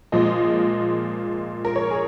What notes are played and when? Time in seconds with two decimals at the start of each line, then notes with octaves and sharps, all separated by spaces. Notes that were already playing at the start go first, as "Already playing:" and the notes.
0.12 A#2 F3 G#3 D#5
1.65 A#4
1.76 C#5
1.91 G#4